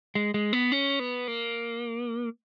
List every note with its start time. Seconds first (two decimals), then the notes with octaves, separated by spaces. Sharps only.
0.15 G#3
0.34 G#3
0.53 B3
0.72 C#4
0.99 B3
1.28 A#3